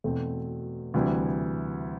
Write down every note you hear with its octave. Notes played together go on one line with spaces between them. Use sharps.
E2 B2 A3 C4
D2 C3 E3 G3